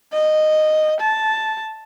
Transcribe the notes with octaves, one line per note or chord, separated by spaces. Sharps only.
D#5
A5